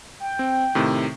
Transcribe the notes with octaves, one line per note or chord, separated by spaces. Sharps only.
G5
C4
A2 C3 D#3